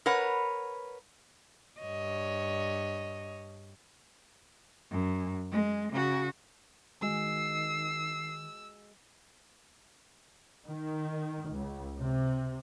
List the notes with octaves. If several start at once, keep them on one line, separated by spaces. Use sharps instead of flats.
A#4 B4 C#5 F#5
G2 C#5 D#5
F#2
G#3
C#3 F#4
D#3 G#3 F#4 D#5 E6 C7
D#3
C#2
C3